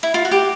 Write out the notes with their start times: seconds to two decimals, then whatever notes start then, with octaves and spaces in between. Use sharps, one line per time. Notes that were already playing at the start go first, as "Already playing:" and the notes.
0.03 E4
0.14 F4
0.25 F#4
0.31 G4